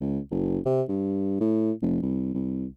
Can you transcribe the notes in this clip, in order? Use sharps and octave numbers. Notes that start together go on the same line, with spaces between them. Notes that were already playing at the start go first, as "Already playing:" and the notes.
C#2
F#1
C3
G2
A2
F1
C2
C2